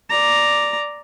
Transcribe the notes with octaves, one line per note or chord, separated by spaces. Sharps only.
D5 A#5